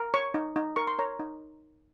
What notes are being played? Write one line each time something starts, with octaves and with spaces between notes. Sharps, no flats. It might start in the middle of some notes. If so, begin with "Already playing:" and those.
Already playing: A#4
C#5 C#6
D#4
D#4
A#4 C#6
C6
A#4 C#5 A#5
D#4